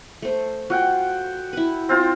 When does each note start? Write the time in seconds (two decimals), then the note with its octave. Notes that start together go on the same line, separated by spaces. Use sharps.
0.22 A3 C5
0.70 F4 F#4 F#5 G5
1.53 E4 B4
1.89 C4 F4 C5